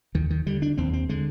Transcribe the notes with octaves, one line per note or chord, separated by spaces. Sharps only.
D#2 D#3
D#3
D3 G3
D4
D#2 C4
C4
D3 G#3